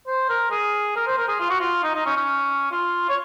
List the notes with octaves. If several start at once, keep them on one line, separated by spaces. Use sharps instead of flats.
C5
A#4
G#4
A#4
C5
A#4
G#4
F4
F#4
F4
D#4
D#4
C#4
C#4
F4
C#5